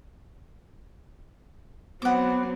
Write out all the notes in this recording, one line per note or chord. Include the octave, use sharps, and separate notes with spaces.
F#3 B3 C4 F#5 D6